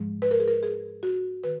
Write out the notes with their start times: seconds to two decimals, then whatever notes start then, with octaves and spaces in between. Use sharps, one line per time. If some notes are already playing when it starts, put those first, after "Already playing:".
Already playing: G#2 F3 G#3
0.22 B4
0.31 A#4
0.39 G#4
0.48 A#4
0.63 G#4
1.03 F#4
1.44 D#3 B4